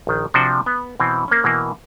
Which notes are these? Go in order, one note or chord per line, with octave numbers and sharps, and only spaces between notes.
A#1 D#3
C3 F3 D4 F#4 C5
B3
B2 E3 C4
A#3 C4 C#4
B2 E3 A#3